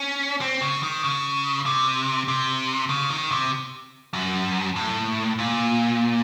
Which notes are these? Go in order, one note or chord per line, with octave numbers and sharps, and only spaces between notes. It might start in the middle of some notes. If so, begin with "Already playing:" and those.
Already playing: C#4
C4
C#3
D#3
C#3
C3
C3
C#3
D#3
C3
F#2
A2
A#2